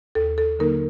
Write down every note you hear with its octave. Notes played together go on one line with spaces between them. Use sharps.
D#2 A4
A4
D3 F#3 A#3 D#4 A#4